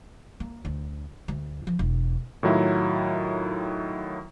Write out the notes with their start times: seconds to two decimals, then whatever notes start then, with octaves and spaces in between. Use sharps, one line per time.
0.40 A#3
0.65 D2
1.28 D2
1.67 F3
1.79 E1
2.43 A2 D#3 F#3 E4 F4